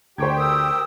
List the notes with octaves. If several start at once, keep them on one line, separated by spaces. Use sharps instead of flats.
D2 D3 G4 C5 G5 C#6 G#6
A#4 D#6 E6